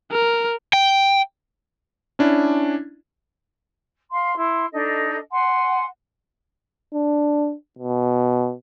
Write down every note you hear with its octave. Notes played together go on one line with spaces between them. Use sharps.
A#4
G5
C#4 D4 E4
F5 C6
E4 C6
D4 D#4 A4 D#5
F#5 G#5 C6
D4
B2